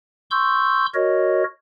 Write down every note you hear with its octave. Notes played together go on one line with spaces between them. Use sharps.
C6 C#6 E6 G6
F#4 A#4 C#5 D#5